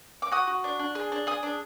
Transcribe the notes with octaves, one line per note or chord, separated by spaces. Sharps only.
D6
F#4 D#6
F#4
D4
D4
G#4
D4
G#4 D#6
D4